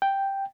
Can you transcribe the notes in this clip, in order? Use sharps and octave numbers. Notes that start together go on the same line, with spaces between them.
G5